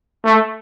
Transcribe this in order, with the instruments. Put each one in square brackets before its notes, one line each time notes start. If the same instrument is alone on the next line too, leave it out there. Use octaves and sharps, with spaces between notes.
[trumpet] A3